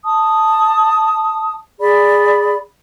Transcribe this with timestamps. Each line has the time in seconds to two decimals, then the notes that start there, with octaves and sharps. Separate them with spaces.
0.04 A5 D#6
1.80 G#4 D5 B5